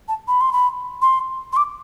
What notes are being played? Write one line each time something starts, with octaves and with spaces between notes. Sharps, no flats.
A5
B5
C6
B5
C6
C6
D6